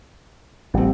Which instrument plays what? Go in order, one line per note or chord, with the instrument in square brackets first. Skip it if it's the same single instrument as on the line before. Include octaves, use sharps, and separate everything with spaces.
[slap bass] A1 A2 [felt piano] G3 C4